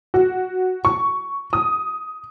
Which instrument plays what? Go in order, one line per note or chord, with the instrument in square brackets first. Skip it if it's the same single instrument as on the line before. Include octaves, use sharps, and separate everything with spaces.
[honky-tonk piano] F#4
C#6
D#6